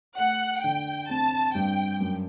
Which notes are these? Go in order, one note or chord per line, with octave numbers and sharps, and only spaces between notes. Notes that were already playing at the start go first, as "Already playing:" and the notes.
A3 F#5
D3 G5
C4 A5
G2 G5
F#2